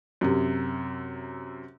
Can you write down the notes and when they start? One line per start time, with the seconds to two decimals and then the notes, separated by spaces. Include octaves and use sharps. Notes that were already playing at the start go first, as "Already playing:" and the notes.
0.21 F#2 C3